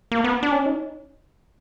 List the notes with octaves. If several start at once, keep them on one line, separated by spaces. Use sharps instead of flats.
A#3
B3
D4
C#4
D#4